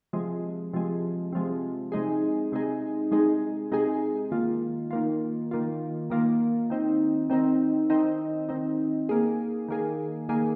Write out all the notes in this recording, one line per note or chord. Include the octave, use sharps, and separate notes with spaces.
C3 F3 G#3
C3 F3 G#3
C3 F3 G#3
C3 G#3 D#4 G#4
C3 G#3 D#4 G#4
C3 G#3 D#4 G#4
C3 G#3 D#4 G#4
D#3 A#3 F4
D#3 A#3 F4
D#3 A#3 F4
D#3 A#3 F4
D#3 C4 D#4
D#3 C4 D#4
D#3 C4 D#4
D#3 C4 D#4
D#3 A#3 G#4
D#3 A#3 G#4
D#3 A#3 G#4